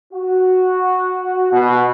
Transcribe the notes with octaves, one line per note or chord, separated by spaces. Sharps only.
F#4
B2